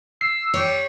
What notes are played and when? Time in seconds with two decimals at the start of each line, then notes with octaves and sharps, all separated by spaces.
0.21 E6 C7
0.54 G3 C#5